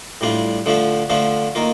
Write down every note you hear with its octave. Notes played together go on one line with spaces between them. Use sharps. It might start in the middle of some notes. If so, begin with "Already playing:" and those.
A2 G3 D4 F4
D3 F3 A3 D4 F4
D3 F3 A3 D4 F4
D#3 A#3 F4